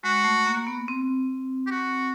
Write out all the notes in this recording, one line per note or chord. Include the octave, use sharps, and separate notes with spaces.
G#3 F#4
A3
A#3
A#3
B3
C4
G4
F#4